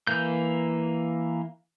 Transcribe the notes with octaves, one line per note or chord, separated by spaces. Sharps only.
E3 A#3 G6